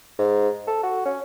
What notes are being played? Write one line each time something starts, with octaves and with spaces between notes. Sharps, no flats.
G#2
A4
F#4
C#4